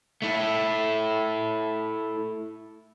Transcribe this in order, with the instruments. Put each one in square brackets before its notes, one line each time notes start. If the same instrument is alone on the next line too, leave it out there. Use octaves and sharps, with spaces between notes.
[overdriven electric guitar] A3 E4